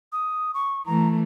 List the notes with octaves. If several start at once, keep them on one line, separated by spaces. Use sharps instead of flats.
D#6
C#6
E3 A3 A#5